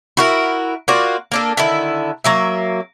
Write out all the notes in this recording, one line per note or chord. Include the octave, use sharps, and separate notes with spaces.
E4 F#4 A#4
A#3 F4 F#4 D5
A#3 D4 A4
D3 D#3 E4
F#3 A#3 E5